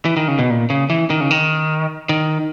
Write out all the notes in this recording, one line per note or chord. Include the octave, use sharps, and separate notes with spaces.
E3
D#3
C#3
B2
A#2
C#3
E3
D#3
C#3
D#3
D#3